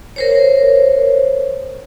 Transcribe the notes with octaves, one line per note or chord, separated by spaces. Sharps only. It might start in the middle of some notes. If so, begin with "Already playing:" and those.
A#4 C5 C#5